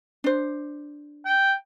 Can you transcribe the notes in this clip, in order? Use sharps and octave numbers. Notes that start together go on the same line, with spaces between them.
D4 C5
G5